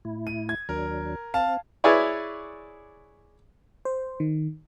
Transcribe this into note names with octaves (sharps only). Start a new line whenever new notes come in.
A2 E4
D#7
G#6
D#2 F#3 D4 A#4
C4 F5 A5
E4 G#4 B4 C#5 D5
C5
D#3